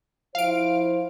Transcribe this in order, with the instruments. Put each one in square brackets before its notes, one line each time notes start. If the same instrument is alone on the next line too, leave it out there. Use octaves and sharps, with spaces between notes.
[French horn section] F3 E4 C5 [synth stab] F5 D7